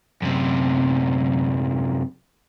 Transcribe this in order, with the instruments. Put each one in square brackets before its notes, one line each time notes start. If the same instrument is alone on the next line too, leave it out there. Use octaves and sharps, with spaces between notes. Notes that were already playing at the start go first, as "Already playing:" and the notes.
[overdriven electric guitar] F#2 C3